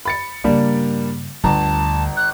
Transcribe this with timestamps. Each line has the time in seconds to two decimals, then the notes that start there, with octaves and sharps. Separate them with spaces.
0.05 B5 A6 C#7
0.44 G2 C#3 G3 A#3 D4
1.44 G1 D2 A5 A#5
2.17 F#6